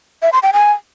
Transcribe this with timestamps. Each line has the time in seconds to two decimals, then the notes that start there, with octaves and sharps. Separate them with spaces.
0.22 E5
0.33 C6
0.43 G5
0.53 G#5